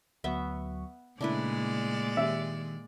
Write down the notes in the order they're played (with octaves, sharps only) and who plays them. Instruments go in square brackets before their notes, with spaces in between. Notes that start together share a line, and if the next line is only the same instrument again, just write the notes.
[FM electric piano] D2 F#3 C#6 [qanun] B3 E5
[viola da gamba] A#2 G#3 D5 [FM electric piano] C#3 A3 [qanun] D4 E4 B4
[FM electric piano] D#3 G4 [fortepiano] E5